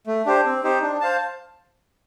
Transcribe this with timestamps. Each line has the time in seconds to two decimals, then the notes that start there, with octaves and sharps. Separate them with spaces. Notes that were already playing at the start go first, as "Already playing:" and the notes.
0.07 A3
0.26 D4 G4 C5
0.45 C4
0.64 D#4 G4 C5
0.82 D4
1.01 C5 F5 A5